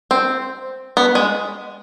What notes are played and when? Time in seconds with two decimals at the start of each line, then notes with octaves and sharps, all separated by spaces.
0.11 C4
0.97 B3
1.15 G#3